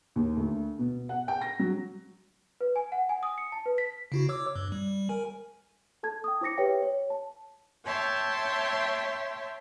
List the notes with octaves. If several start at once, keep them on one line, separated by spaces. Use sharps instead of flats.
D#2
D2
B2
F#5
G5
A#6
F#3
B4
G#5
F#5
G#5
D#6
C#7
A5
B4
B6
C#3 E4 F#4
C#5 D6 E6
G2
G3
A#4 G#5
A4 A5 G#6
G5 D#6
E4 C5 D6 A#6 C#7
G4 B4 C#5 E5 G5
C#5
A5
C#5 E5 G5 A5 C6